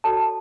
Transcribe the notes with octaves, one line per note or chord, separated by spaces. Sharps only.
F#4 A4 C#5 A5